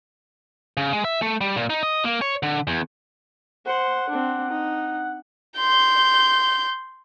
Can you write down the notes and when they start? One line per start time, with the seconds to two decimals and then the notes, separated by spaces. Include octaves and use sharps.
0.77 C#3
0.93 G#3
1.05 E5
1.22 A3
1.41 G3
1.56 A#2
1.70 D#4
1.83 D#5
2.05 A#3
2.22 C#5
2.43 D3
2.67 E2
3.66 C5 F#5
4.10 C4 D4
4.49 D#4
5.57 C6 G6